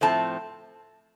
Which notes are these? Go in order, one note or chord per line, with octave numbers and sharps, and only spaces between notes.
A2 F3 A3 C4 A5